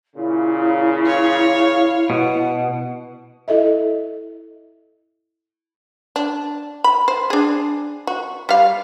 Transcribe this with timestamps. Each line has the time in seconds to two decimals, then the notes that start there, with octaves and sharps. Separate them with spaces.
0.16 A#2 C#3 E4
1.06 C#5 F5
2.10 B2 F#5
3.48 E4 A4 D#5 E5
6.16 D4
6.84 B5
7.08 C5
7.30 D4 G#4
8.07 F#4
8.49 G3 F5